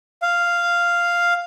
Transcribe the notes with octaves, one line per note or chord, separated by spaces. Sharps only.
F5